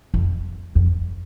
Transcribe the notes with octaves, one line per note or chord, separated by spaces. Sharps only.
F2
F2